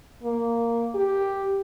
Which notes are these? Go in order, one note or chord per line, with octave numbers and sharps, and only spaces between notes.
A#3
G4